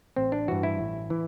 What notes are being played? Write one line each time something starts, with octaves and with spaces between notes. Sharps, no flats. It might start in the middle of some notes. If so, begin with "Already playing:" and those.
A1 C4
D4
G2 E3 F#4
E4
A1
E3